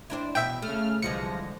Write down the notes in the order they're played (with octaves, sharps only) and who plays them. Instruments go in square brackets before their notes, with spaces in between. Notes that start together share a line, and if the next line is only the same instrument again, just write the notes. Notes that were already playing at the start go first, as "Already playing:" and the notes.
[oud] C4 D4 E4
[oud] E2 B2 [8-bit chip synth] E5 G5
[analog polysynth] C#3 F6 [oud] A3
[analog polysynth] C2 F3 A#6 [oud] D3 E3 G#3 [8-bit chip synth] C#7